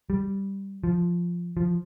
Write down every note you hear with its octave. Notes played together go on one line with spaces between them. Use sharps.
G3
F3
F3